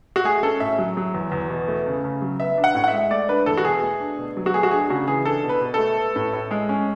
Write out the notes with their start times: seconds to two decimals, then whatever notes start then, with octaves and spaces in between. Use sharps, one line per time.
0.16 F#4
0.24 A3 G#4
0.43 C#4 A4
0.60 A2 E5
0.79 F#3
0.97 F#3
1.14 E2
1.32 E2
1.50 B2
1.68 A3
1.86 C#3
2.04 C#3
2.22 F#3
2.40 B3 E5
2.57 D4
2.64 F#5
2.75 A2
2.84 F#5
2.88 E5
2.93 G#3
3.10 A3 D5
3.29 D4 B4
3.46 E2 A4
3.57 F#4
3.64 B2 G#4
3.83 A3
4.00 D4
4.19 B2
4.37 F#3
4.46 F#4
4.54 A3 G#4
4.63 F#4
4.71 D4 G#4
4.90 C#3 F#4
5.07 E3 G#4
5.25 D4 A4
5.43 B2
5.49 B4
5.61 B2
5.74 A3 A4
5.98 B3
6.16 A2
6.33 A2
6.51 G#3
6.69 C#4